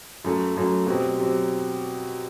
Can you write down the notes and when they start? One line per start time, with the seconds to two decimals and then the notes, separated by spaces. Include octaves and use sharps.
0.24 F#2 F#3 A3
0.56 F#2 F#3 A3
0.87 B2 F#3 C4 G4
1.18 F#3 C4 G4